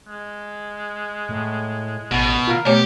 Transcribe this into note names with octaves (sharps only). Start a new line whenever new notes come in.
G#3
A2
A1 B2
F4 A#4
B2 A3 G4 C#5